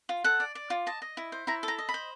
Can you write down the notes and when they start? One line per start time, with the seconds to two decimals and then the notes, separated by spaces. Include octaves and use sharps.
0.09 F4
0.24 A4 F#5
0.40 D5
0.55 D5
0.70 F4
0.86 D#5 A5
1.02 D#5
1.17 E4
1.32 C5
1.47 E4 A#5
1.63 A4
1.68 A#5
1.79 D#5
1.89 B5
1.94 C5